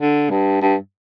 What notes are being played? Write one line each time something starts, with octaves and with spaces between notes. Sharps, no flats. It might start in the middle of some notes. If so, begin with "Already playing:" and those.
D3
G2
G2